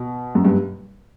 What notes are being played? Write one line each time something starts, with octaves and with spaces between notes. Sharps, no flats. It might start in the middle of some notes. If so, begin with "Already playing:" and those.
Already playing: B2
F#2
G2